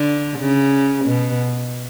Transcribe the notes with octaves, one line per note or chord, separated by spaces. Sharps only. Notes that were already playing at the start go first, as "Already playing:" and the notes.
Already playing: D3
C#3
B2